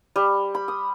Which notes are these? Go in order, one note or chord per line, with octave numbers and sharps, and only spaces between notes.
G3
B5
D#6